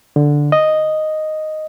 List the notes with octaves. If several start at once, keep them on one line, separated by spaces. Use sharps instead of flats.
D3
D#5